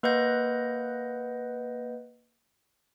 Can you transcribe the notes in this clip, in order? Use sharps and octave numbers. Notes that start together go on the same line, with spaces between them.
A#3 B4 D#5 F#5 G6 A#6